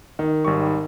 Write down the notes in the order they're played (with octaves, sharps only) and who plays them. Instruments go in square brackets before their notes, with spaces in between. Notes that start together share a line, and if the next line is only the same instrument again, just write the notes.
[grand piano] D#3
[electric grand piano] G#1 G3 C#6